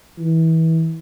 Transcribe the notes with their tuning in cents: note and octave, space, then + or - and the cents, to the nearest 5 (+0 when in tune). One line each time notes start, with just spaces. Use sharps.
E3 -25